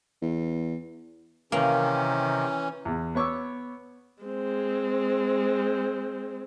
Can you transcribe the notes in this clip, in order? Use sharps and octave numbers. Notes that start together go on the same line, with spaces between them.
E2
C3 D#3 E3 A#3 C#4
E2
B3 C#5 C#6 D6 E6
G#3 C4